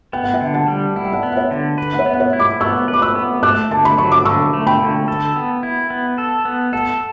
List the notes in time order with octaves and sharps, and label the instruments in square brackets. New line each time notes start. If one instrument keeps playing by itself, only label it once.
[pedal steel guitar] B3 [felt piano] G5
[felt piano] F#5
E5 G5
[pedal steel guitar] D3
[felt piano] F#5 A5
[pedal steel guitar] G3
[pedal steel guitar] E4 [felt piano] F#5
[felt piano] G5
D5 F#5
[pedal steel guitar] B3
[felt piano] F#5
C#5 E5
[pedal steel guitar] D3
B4
[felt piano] F#5
C#5 E5
[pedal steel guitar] B3
[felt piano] F#5
C#5 E5
[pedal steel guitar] E4
[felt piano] B5 D6
[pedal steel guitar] B3 [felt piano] C#6 E6
[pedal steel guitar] B4
[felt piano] D6
C#6 E6
[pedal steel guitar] B3
[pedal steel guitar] A3 [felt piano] D6 F#6
[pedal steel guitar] D3 [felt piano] A5
[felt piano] B5
[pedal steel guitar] F#3 [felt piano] C#6
[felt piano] D6
[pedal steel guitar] D3 [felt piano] C#6 E6
[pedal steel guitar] A3
[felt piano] G5 B5
[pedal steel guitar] D3
A4
B3
E4
B3
A4
B3
[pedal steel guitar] A4 [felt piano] F#5 A5